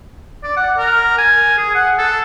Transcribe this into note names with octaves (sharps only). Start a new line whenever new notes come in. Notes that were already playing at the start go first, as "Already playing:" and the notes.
D5
F#5
A#4
G#5
G#4
F#5
A4